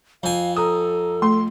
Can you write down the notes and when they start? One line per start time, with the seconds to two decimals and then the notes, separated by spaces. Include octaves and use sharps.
0.23 F2 F5 G#5
0.57 A4 A#5 D#6
1.22 A3 C6